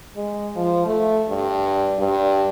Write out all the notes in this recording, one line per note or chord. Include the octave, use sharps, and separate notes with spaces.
G#3
F3
A3
G2
G2